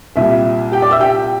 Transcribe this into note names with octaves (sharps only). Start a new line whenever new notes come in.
C2 A#2 G3 E5
G4 G5
D5 D6
E5 E6
G4 G5